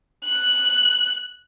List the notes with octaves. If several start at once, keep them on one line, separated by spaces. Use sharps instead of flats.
F#6